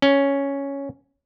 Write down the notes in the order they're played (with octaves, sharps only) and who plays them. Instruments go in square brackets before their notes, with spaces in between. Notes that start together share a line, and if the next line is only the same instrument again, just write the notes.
[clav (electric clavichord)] C#4